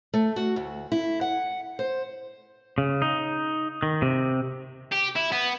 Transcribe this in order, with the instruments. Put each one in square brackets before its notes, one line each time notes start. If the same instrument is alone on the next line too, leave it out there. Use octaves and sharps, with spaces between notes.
[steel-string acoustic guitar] A3
F#4
D2
E4
F#5
C5
[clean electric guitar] C#3
D#4
D#3
C3
[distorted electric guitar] G4
E4
B3